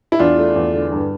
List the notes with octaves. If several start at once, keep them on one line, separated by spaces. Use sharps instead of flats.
E4
E2 D4 F4
A3
E2
D3
G2